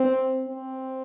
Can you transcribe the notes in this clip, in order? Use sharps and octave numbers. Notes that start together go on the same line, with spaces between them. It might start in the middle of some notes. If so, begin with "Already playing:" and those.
Already playing: C4
C4